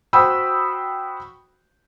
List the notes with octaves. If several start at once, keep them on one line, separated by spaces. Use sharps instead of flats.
F#4 C5 G5 B5 D#6 E6